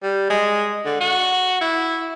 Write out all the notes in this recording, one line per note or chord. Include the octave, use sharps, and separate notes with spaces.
G3
G#3
D3
F#4
E4